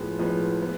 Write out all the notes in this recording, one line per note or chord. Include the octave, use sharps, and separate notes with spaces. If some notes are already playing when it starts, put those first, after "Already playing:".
Already playing: A2 F3 G#3 B3
A2 F3 G#3 B3
G#3 B3